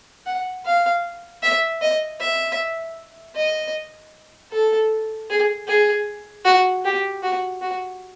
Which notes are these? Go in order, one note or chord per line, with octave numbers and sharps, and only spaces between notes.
F#5
F5
E5
D#5
E5
D#5
A4
G#4
G#4
F#4
G4
F#4
F#4